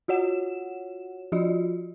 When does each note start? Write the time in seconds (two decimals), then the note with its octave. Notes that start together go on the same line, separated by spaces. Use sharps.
0.08 F4 F#4 C#5 F#5 E7
1.32 F3 F4 F#4 D5 D#5